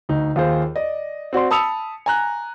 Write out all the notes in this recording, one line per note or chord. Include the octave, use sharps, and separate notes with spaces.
D2 D#4
D#2 F4 G#4 C5
D5 D#5
C4 F#4 D5 C6
A5 B5 D#6 E6 C#7 F7
G#5 A#5 F#6